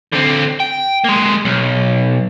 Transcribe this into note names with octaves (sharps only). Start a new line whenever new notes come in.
D3 C4
G5
G#3 A#3
B1